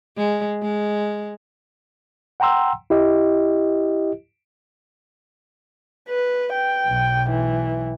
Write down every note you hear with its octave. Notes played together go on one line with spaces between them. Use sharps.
G#3
G#3
F#5 G5 A#5 C6 E6
E4 G4 D#5
B4
G5
B1
E3